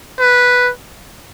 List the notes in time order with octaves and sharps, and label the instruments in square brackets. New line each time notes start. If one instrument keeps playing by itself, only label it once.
[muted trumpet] B4